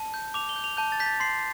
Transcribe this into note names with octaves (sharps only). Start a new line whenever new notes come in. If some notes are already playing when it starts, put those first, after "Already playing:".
Already playing: A5
G6
D6 F7
G7
G6
F7
A5 G6
A6
G6 B6
A6
C6 C7